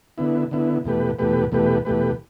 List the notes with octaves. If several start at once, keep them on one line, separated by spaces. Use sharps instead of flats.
D3 B3 E4
D3 B3 E4
E2 B2 A3 G4 B4
E2 B2 A3 G4 B4
E2 B2 A3 G4 B4
E2 B2 A3 G4 B4